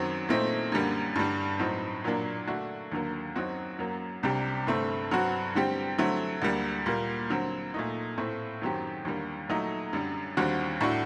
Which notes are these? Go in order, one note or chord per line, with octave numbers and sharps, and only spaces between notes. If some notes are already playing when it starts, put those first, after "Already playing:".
Already playing: F#2 D#3 F#3 C4
A#2 A3 C4 D#4
F#2 D3 G3 A#3
G2 D3 G3 D4
A2 F#3 C4 D#4
A#2 F#3 A#3 D4
D3 A3 D4 F#4
D#2 D3 F#3 A#3
F#2 F#3 C4 D#4 F#4
F#2 F#3 A#3
C2 C3 G3 D4 G4
G2 D3 A3 C4
G2 F#3 C4 F#4
D3 G3 C4 G4
D3 F#3 A3 C4
D2 D3 G3 A#3
A#2 G3 A#3
D3 F#3 C4
A#2 A3 D#4
A2 A3 C4
F#2 D#3 F#3 C4 G4
D#2 D3 G3 A#3
A#2 F#3 A3 D#4
F#2 D3 G3
D#2 D3 G3 C4 F#4
A2 A3 D4 F#4